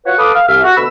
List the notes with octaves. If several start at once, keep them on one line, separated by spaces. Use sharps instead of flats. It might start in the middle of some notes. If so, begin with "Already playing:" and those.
F4 F#4 B4 C#5 F#5
A4 B4 F5 A5 D6 D#6
F5
C2 E5 F6
F#4
D2 B2 B5 E6